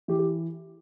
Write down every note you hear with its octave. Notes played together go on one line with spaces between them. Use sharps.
E3 G4
G4